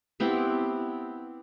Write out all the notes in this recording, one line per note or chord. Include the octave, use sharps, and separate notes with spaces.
B3 C4 E4 G4